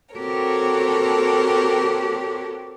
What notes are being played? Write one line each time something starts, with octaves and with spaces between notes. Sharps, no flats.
C4 F#4 G4 A4 A#4 C#5